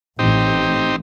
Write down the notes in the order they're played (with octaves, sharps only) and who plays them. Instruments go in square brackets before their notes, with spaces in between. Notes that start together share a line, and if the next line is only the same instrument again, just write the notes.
[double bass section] A1 [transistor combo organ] C4 D#4 G4